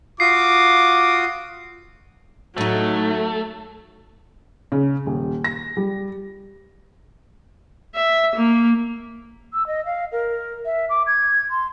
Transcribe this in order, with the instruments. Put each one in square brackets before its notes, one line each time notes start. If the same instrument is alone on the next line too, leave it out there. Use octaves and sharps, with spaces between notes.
[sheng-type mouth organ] F4 F#4 D#6 [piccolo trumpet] D6 [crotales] C7
[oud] A2 D#4 [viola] F#3 [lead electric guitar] A3
[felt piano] C#3
D#1
A#6
G3
[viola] E5
A#3
[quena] E6
D#5
F5
A#4
E5
D6
G#6
C6